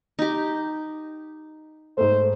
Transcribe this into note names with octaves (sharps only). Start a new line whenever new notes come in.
D#4 G4
G#2 A3 C5